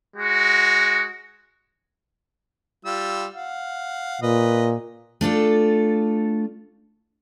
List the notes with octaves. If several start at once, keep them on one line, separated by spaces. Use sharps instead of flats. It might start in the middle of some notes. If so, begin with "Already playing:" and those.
G#3 F#4
G3 F4 E6
F5 F#5
A#2 B4 D#5
A3 D4 F4 A4